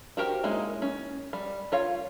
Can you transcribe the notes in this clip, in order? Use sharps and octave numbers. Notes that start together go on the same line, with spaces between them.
F#4 G4 A#4 C5
G#3 A#3 C#4 D#4 E4
C#4
G3
F4 C#5 F5